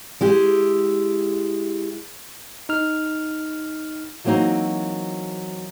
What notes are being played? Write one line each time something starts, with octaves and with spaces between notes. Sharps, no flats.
G#3 E4 G4
D#4 F6
E3 F#3 A#3 C4 D#4 F#4